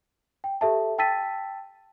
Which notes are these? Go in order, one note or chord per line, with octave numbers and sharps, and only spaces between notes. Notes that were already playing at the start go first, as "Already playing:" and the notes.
G5
G4 A4 E5 A5
G5 A5 E6 A6 B6 D#7